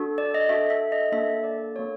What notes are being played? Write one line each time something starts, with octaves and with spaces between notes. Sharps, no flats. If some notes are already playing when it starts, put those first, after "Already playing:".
Already playing: D4 F#4 A4
D5
D#5
D4 F#4 A4 E5
E5
D#5
A#3 D4 F#4 A4 E5
D5
A#3 D4 F#4 A4 C#5